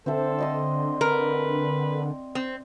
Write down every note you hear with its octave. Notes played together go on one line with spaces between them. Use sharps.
D3 C4 A4 C5 E5
D5 D#5 C6
A#4 B4
C4